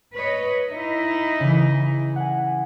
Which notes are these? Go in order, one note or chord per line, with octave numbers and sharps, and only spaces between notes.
B4 C#5 D#5
D#4 E4 D#5
C#3 E3
F#5 G#5